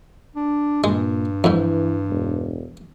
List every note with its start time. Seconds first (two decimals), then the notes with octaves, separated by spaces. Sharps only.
0.36 D4
0.84 G2 A#2 G#3
1.44 F2 G#2 E3
2.10 E1